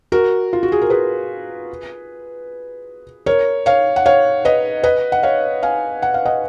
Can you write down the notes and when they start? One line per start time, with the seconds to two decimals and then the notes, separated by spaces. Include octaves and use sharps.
0.12 F#4 A#4
0.53 F4
0.63 F#4
0.72 G#4
0.82 A#4
0.90 G#4 B4
3.26 A#4 C#5
3.66 C#5 F5
3.96 F#5
4.06 C#5 F5
4.45 B4 D#5
4.84 B4 D#5
5.12 F#5
5.23 C#5 F5
5.63 F5 G#5
6.02 F#5
6.14 F5
6.25 D#5 F#5